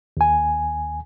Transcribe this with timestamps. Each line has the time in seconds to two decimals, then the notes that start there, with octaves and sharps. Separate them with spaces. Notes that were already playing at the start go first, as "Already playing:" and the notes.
0.17 D#2 G#5